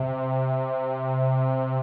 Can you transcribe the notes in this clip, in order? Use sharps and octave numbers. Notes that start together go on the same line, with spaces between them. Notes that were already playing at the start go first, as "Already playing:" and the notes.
Already playing: C3